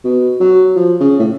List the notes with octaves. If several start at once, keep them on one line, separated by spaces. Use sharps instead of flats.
B2
F#3
F3
C#3
A2